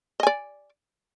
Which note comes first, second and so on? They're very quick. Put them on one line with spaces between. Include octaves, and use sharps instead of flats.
D#5 G#5 D5